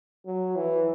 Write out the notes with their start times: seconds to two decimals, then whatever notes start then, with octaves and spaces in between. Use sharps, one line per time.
0.26 F#3
0.56 E3